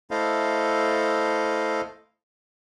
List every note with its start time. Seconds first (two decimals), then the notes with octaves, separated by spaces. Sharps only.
0.11 A3 E4 A4 C5 D#5 F5